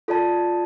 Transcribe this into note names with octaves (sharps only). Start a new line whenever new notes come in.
F4 A4 D5 A5